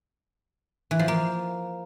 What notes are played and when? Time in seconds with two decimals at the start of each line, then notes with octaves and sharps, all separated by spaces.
0.91 E3
0.99 F3
1.08 A#3